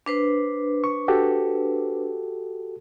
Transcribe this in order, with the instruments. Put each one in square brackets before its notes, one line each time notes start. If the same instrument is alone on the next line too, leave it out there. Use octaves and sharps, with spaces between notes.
[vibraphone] D4 B4 C5
[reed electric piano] C#6
F#4 G4 A4